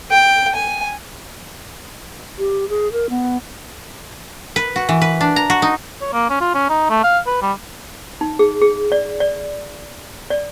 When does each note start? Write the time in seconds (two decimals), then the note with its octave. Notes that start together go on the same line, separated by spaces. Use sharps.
0.12 G5
0.55 G#5
2.38 G4
2.69 G#4
2.92 A#4
3.10 B3
4.56 B4
4.76 F#4
4.89 E3
5.01 B4
5.21 D4
5.36 A#5
5.50 F#4
5.62 D#4
6.01 C#5
6.13 A#3
6.30 C#4
6.41 F4
6.54 C#4
6.70 D#4
6.90 A3
7.04 F5
7.27 B4
7.42 G3
8.21 D#4
8.39 G#4
8.62 G#4
8.92 D5
9.20 D5
10.30 D5